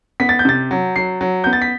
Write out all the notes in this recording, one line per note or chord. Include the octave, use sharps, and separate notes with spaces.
B3 B6
A6
G6
C3 A6
F#3
F#3 C7
F#3
B3 G6
A6
B6